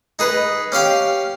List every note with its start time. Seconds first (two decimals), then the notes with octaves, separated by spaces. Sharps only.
0.19 D#4 G#4 B4
0.72 C#4 G4 F5 G5